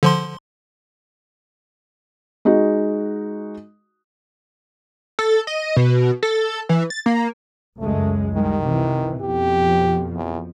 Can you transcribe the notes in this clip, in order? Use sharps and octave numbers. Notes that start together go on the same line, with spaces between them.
D3 F3 C6
G#3 D#4 F#4
A4
D#5
B2
A4
E3
A6
A#3
C#2 F#2 G#3 A3
C2 D#3 G3 G#3
C3 E3
F2 B2 F3 G4
E2